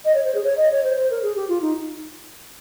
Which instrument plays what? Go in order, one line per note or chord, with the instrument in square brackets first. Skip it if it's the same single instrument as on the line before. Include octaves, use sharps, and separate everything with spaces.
[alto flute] D#5
C#5
C5
G#4
C#5
D#5
C#5
C5
C5
A#4
G#4
G4
F4
D#4